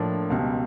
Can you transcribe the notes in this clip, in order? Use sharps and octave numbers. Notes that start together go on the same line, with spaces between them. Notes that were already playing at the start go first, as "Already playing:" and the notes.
Already playing: A2 F3 A#3 D4
C#2 B2 G3